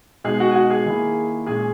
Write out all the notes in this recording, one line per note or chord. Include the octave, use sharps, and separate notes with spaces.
B2 G#3 D#4 G#4
F#4 F#5
G#5
F#4 F#5
G#4 G#5
D#3 A#3 E4
A#2 G#3 C#4 G#4 G#5